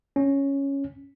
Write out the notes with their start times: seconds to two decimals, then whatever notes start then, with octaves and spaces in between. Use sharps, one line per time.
0.16 C#4